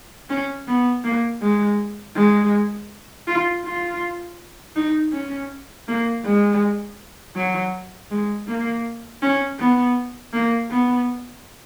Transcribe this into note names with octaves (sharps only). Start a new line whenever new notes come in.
C#4
B3
A#3
G#3
G#3
F4
F4
D#4
C#4
A#3
G#3
F#3
G#3
A#3
C#4
B3
A#3
B3